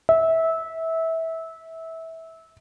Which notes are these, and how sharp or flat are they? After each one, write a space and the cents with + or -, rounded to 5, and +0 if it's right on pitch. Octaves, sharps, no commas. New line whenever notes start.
E5 -20